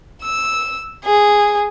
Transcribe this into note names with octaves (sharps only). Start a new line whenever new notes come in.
E6
G#4